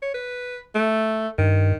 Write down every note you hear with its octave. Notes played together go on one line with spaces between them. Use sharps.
C#5
B4
A3
G2 D#3